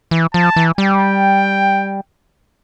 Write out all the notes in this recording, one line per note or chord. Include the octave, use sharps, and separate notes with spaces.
E3
F3 A5
E3
G3 G5